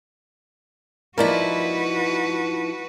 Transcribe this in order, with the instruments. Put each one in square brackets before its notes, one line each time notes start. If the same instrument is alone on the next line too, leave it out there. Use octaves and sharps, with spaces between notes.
[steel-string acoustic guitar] F3 D#4 E4 [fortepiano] A#3 D5 [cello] F#4 B4